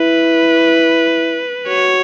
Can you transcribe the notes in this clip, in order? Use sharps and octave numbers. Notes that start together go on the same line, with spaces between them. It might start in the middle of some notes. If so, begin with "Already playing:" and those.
Already playing: E4 B4
F#4 C#5